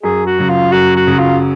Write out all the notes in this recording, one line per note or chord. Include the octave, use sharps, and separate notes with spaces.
F#2 G#4
F#4
C#3 F#3
F4
F#2 F#4
F#4
C#3 F#3
F4